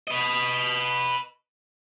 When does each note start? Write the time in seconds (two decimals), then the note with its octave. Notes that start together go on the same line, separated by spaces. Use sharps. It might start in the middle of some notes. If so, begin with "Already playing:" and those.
0.08 B4 D#5